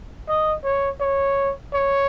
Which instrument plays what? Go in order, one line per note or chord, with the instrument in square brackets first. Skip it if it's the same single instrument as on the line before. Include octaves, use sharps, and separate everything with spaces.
[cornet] D#5
C#5
C#5
C#5